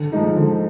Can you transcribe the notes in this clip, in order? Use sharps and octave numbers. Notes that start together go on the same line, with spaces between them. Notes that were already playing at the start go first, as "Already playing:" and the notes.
Already playing: D3
F3 G#3 D#4
D3